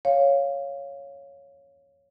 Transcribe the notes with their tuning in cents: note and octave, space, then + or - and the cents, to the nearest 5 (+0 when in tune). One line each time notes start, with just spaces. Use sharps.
C#5 +0 F5 +0